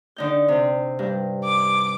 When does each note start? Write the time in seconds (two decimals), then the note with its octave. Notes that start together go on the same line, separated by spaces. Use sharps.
0.16 D3 D#4 G6
0.48 C3
0.99 G2
1.44 D6